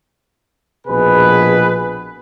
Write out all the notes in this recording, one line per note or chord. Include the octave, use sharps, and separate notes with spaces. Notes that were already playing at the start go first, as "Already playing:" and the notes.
A#1 B2 G#4 B4